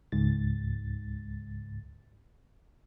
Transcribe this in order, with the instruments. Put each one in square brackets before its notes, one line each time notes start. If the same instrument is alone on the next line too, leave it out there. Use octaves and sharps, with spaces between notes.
[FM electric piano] C#2 G#2 A6